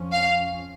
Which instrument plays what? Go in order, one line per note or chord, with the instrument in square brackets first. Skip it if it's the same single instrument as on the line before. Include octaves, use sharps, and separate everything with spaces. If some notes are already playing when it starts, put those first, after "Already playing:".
Already playing: [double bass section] F2 F3 C#4
[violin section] F5